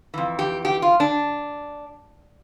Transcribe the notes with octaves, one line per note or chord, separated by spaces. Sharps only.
F2 E3
G4
G4
F4
D4